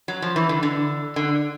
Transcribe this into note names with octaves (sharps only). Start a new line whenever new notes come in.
F#3
F3
E3
D3
D3
D3